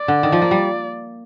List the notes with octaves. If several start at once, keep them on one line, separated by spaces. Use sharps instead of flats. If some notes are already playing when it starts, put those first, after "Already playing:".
Already playing: D5
D3
D#3
F3
A#3
G3